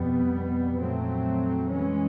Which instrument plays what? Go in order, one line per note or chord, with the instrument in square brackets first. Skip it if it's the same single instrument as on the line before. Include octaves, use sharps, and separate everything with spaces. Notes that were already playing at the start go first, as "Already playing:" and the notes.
Already playing: [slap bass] F2 [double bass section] B2 G3 B3
[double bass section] A#2 F#3 A3 C4
E3 G#3 C#4